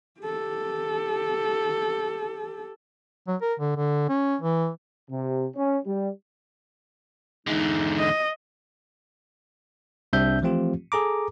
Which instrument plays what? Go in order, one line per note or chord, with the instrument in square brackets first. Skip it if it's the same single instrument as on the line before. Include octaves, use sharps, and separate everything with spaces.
[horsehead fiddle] G4 A4
[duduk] F#3
A#4
D3
D3
C#4
E3
[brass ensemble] C3
C#4
G3
[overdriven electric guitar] E2 D3 [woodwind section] G#3 D#4
[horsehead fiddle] D#5
[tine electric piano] C2 G3 C4 D4 E5 G6
E3 F3 A3 C4 F4 G4
G#4 A4 A#5 D6